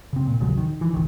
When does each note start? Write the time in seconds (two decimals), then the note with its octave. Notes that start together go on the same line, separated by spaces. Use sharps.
0.13 C#3 C4
0.27 A#2
0.40 D#1 A1 C#3 F#3
0.57 D#3
0.81 E3
0.94 G#1 C#2 D#3